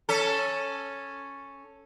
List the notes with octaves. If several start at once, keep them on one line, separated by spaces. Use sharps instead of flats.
C#4 A4